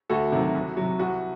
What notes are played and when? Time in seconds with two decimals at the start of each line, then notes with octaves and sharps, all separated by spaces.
0.09 D2 F#4 A4
0.32 C3 D#3 F#3
0.54 C2
0.77 C3 F#3
0.99 C2 F#4